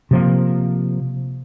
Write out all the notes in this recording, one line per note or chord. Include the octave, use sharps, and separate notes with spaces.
C3 F3 A#3